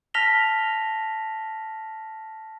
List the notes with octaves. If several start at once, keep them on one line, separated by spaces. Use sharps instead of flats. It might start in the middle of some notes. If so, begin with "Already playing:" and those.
A5 F6 A#6 B6 F7 G7